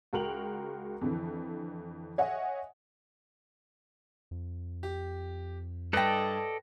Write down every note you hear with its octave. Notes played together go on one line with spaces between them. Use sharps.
C#2 F#4 A#4 G5 F7 F#7
F2 D3 E3
C#5 D#5 E5 F#5 G#5
F2
G4
G2 A4 B4 D5 D#5 G5 A5 A#6